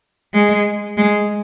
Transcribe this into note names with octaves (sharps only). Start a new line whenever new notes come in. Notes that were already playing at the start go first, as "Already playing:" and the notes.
G#3
G#3